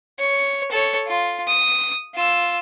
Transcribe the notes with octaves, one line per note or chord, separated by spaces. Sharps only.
C#5
A4 C#5
F4
D#6
F4 E6